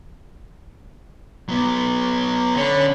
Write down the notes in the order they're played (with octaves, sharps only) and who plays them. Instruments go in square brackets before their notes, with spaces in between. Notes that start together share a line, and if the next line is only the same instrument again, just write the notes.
[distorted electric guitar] F#3 B3
[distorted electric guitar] D3 [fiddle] C#4 B5